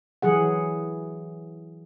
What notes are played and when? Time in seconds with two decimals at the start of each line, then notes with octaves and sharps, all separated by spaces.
0.22 E3 F#3 G#4 F#5